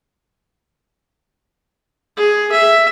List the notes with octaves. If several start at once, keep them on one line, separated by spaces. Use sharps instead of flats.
G#4
E5